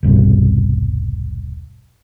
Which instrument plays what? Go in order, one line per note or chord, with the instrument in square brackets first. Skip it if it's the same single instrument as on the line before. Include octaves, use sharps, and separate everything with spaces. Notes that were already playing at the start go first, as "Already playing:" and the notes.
[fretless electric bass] D#1 B1 G2 C3